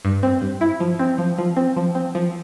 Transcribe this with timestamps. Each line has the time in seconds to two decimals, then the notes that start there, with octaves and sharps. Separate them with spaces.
0.05 G2
0.23 C4
0.42 G2
0.61 E4
0.80 F3
0.99 C4
1.18 F3
1.38 F3
1.57 C4
1.76 F3
1.95 C4
2.15 F3